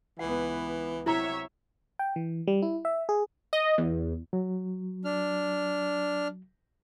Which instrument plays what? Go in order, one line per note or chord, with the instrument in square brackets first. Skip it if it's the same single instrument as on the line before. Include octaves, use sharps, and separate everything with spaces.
[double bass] C#2 B3 [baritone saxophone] E3 [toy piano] F#5
[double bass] C3 F#3 [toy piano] E4 A#5 [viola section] C#5 E5
[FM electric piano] G5
E3
G3
E4
E5
G#4
[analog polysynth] D#5
E2
[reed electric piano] F#3
[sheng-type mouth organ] D4 F6